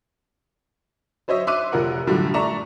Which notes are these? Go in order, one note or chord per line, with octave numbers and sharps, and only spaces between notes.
F#3 C5 C#5 D#5 E5
E5 C6 D6 F#6 D#7
F1 F3 A#4 F#5
F#2 A2 D3 F3 G3
A3 D5 A#5 C#6 E7